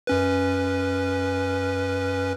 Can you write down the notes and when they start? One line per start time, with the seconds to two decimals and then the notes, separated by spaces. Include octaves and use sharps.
0.07 F#2 C#4 B4